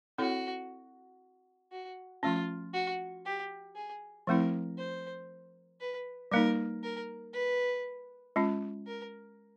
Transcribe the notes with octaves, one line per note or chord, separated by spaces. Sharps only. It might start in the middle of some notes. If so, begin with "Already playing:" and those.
C4 E4 F#4 A4 C#5
F#4
F3 A3 C#4 F4
F#4
G4
G#4
F3 A3 C4 E4 A#4
C5
B4
G3 A#3 D#4 A#4
A#4
B4
G#3 C#4 F4
A#4